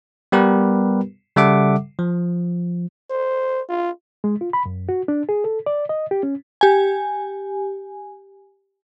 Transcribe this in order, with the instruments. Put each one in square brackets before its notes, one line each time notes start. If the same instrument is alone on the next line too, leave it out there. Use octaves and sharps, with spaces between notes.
[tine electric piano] G3 B3 G4 A#4 B4
C#3 G3 A4 E5 F#5 D6
F3
[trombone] C5
F4
[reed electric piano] G#3
F4
B5
F#2
F#4
D4
G#4
A4
D5
D#5
G4
C#4
[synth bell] G4 G#5